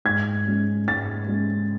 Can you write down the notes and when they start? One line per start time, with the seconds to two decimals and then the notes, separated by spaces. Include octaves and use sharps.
0.05 G#2 G#6
0.46 G#3 C#4
0.88 G#2 A6
1.28 G#3 C#4